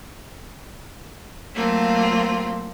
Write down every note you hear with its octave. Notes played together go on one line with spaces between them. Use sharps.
F#3 A3 A#3 C4 F4